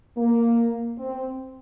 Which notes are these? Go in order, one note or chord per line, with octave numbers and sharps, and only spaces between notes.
A#3
C4